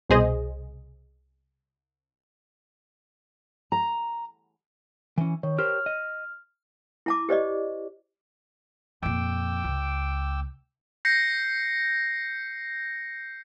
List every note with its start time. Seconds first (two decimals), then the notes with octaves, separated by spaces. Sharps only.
0.09 C2 B2 G#4 C5 D#5
3.72 A#5
5.18 E3 C#4
5.43 D#3 C#5
5.59 G4 A#4 C5 F6
5.86 D#5
7.06 E4 A5 D6
7.29 G4 C5 D5 D#5
9.03 F2 A#2 G5 D6 E6
9.64 C#2
11.05 G6 A#6 C7 C#7